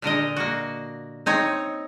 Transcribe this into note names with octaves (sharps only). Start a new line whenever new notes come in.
A#2 D3 A#4 D#5
A#3 F#4
C4 D#4 C#5